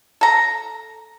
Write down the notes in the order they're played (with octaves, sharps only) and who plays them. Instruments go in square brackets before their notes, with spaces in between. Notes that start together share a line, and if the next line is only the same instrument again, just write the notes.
[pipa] A4 A#5